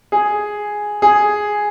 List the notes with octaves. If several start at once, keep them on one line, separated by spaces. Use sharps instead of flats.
G#4
G#4